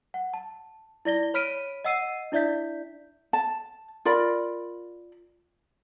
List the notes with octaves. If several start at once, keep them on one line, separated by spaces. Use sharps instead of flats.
F#5
A5
E4 D5 A#6 G7
C#5 B5 F6 B6 D7 D#7
D#5 F#5 E6 C7 D#7
D4 E4 D5 E5 G6 B6
A5
F4 A#4 D5 B5